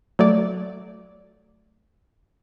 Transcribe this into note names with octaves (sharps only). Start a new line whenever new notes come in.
F#3 A3 D5